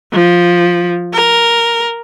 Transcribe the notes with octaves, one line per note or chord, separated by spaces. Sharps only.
F3
A#4